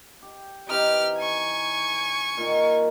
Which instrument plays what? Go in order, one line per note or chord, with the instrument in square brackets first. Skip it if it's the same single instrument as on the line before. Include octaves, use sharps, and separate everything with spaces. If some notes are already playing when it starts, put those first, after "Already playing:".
[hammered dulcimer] G4
[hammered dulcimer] E3 C4 D#4 [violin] G4 F6
[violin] G#5 C#6
[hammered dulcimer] A#2 D#3